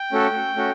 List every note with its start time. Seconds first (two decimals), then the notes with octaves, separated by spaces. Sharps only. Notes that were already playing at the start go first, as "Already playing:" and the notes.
Already playing: G5
0.12 A3 C#4 F#4 A4
0.56 A3 C#4 F#4